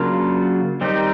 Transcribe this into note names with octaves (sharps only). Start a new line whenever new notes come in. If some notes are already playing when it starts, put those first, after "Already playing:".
Already playing: C#3 F#3 A#3 D4 F4
D#3 G3 C4 D#4 G4